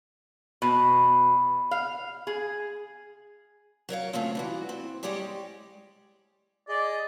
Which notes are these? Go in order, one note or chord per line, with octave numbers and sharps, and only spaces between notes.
B2
F5
G#4
F#3 A#4 C#5 F5
C#3 A3 C4 F4
E3 G3 F#4
C4
G3 G#3 G4 G#4 C#5
G#4 D5 D#5